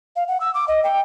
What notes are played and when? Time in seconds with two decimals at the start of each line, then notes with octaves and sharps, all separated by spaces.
0.16 F5
0.28 F#5
0.41 E6
0.54 D6
0.68 D#5
0.84 G5